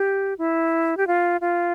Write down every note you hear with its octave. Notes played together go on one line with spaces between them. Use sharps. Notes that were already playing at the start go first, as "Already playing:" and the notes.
Already playing: G4
E4
G4
F4
F4